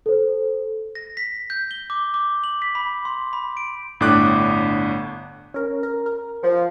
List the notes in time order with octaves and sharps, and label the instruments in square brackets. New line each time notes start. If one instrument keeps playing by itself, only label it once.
[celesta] A4 C5
[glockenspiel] A#6
B6
G6
G7
D6
D6
F#7
B6
B5
C6
B5
D7
[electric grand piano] G1 A2 D4 D6 F#6
[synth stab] C#4 A#4
A#4
A#4
[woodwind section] F3